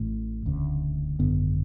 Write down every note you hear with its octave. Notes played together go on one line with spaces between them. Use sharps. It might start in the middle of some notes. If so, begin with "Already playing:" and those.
Already playing: A1 A2 A3
E1 D2 C#3
G#1 F#2 D3 B3